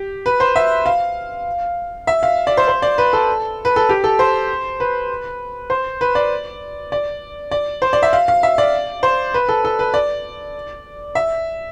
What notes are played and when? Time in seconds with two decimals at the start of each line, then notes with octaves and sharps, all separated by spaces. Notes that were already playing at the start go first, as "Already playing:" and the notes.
Already playing: G4
0.26 B4
0.40 C5
0.56 E5
0.86 F5
2.07 E5
2.23 F5
2.47 D5
2.57 C5
2.68 C5
2.82 D5
2.98 B4
3.13 A4
3.65 B4
3.76 A4
3.89 G4
4.04 A4
4.19 C5
4.80 B4
5.70 C5
6.01 B4
6.15 D5
6.92 D5
7.51 D5
7.82 C5
7.93 D5
8.03 E5
8.13 F5
8.28 F5
8.43 E5
8.58 D5
9.03 C5
9.34 B4
9.49 A4
9.65 A4
9.79 B4
9.94 D5
11.15 E5